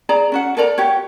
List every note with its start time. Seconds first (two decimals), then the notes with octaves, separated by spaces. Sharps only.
0.09 G#4 D5 A#5
0.32 C#4 F#4 F#5
0.57 A4 A#4 D5 A#5
0.78 F#4 G4 C#5